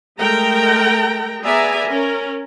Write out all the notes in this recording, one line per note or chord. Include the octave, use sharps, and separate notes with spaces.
G#3 A3 A#4 G5 A#5
B3 G#4 D5 E5 G#5 A#5
C#4 A#4